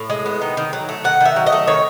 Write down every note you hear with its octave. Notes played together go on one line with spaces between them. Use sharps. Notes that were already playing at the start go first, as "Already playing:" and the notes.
Already playing: A2
G#3
B3
D#3
D#3
F#3
A3
D#3 F#5
D#3 E5
F#3
D#5
A3
D#3 C#5